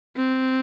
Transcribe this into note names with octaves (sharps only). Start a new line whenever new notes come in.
C4